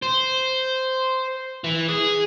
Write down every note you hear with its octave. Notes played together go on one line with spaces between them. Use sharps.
C5
E3
G#4